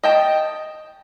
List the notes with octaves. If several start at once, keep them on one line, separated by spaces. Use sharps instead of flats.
D#5 G5 A5